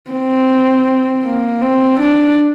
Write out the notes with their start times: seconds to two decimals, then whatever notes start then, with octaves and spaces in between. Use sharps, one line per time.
0.11 C4
1.24 A#3
1.61 C4
2.00 D4